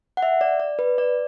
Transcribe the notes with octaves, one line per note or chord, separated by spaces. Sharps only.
F#5
E5
D5
D5
B4
D5